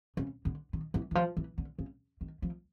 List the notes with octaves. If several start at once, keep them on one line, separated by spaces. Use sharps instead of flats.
C#3
D3
D#3
E3
E3
F3
E3
D3
C#3
D#3
F3